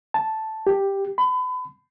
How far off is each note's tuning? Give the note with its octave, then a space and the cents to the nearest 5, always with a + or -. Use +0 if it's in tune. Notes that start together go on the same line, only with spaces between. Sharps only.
A5 -5
G4 +5
B5 +35